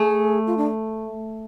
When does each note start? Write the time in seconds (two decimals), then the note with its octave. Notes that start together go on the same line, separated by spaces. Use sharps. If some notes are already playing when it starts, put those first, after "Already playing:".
Already playing: A3 G#4
0.47 F4
0.57 D4